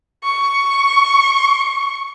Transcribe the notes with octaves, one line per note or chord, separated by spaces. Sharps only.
C#6